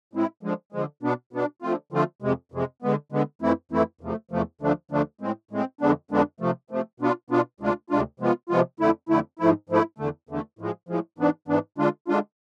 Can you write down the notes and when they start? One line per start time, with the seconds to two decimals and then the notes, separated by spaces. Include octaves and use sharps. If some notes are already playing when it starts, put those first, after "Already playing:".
0.13 A2 G#3 C4 E4
0.43 D3 F3 G#3
0.72 D3 F3 G#3
1.03 B2 B3 D4
1.33 B2 B3 D4
1.62 D3 F3 A3 C4 F4
1.92 D3 F3 A3 C4 F4
2.22 F2 C3 G#3
2.52 F2 C3 G#3
2.82 D3 G#3 B3
3.12 D3 G#3 B3
3.42 F2 E3 A3 C4 E4
3.72 F2 E3 A3 C4 E4
4.01 E2 C3 F3 A3
4.31 E2 C3 F3 A3
4.61 D2 D3 F3 A3 D4
4.91 D2 D3 F3 A3 D4
5.21 A2 G#3 C4
5.51 A2 G#3 C4
5.81 F2 D3 G#3 B3 D4
6.11 F2 D3 G#3 B3 D4
6.40 C3 F3 A3
6.70 C3 F3 A3
7.00 B2 B3 D4 F4
7.30 B2 B3 D4 F4
7.60 D2 C3 G#3 D4 F4
7.90 D2 C3 G#3 D4 F4
8.20 C3 F3 G#3 B3 F4
8.49 C3 F3 G#3 B3 F4
8.80 F2 D3 A3 E4
9.09 F2 D3 A3 E4
9.39 G#2 F3 A3 E4
9.69 G#2 F3 A3 E4
9.98 E2 D3 A3
10.29 E2 D3 A3
10.59 A2 F3 G#3
10.89 A2 F3 G#3
11.18 G#2 E3 B3 D4
11.48 G#2 E3 B3 D4
11.78 D3 G#3 D4 F4
12.08 D3 G#3 D4 F4